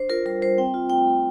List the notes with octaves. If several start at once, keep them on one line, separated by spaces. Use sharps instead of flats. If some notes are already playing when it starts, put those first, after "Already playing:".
Already playing: D4 C5
F4 A#4
G3 A#4
G3 C5
C4 G5
F4
A3 G5
A3